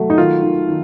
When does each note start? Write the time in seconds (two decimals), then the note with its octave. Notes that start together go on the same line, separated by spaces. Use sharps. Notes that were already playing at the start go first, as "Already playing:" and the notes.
Already playing: F#3 A3
0.10 D#4
0.17 D#3 F4
0.43 D#3
0.68 D#3